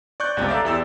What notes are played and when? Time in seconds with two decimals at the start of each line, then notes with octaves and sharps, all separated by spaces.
0.20 D5 C#6 F#6 G6
0.37 G1 C#2 C3 G6 A6
0.48 A4 D5 E5 F5 A#5 D6
0.65 E2 G4 D5 E6 A6 E7